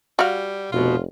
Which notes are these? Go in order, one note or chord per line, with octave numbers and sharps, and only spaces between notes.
G3 F#4 F5
F1 B2 F4